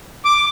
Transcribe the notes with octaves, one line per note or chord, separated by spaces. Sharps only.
D6